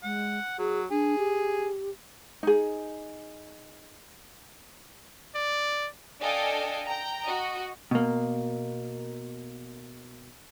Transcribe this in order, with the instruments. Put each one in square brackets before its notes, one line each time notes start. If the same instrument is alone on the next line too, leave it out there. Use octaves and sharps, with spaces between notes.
[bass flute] G#3 [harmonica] F#5
[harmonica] F#3 [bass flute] G#4
[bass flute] D4 [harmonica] G#4
[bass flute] G4
[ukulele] D#4 G#4
[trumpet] D5
[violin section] D4 A4 D#5 F5 G5 G#5
G5 A#5
F#4 D#5
[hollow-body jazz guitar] B2 A#3